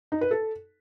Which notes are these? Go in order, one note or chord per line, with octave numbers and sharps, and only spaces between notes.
D#4
B4
A4